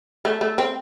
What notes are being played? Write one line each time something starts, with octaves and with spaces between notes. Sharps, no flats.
A3
A3
C4